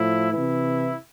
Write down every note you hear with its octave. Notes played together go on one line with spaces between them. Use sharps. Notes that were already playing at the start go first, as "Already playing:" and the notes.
Already playing: A2 F3 E4
E3 E4
C3